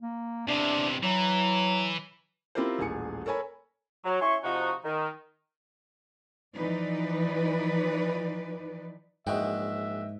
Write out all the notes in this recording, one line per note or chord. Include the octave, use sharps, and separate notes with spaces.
A#3
E2 C3 D4
E3 F#3
C4 E4 F4 G4 A#4 C5
D#1 A1 G#4 G#5 C#7
A4 A#4 C#5 G#5 B5
F#3
C#4 E4 E5 G#5 C6 C#6
C3 F3 D#4 F#4
D#3
E3 F3 D#4 B4 D5
A#1 G#2 E3 F#4 D#5 E5 G5